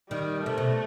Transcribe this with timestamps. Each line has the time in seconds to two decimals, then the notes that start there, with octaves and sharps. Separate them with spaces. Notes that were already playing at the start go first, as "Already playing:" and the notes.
0.10 D#3 G3
0.42 C3 A3
0.58 B2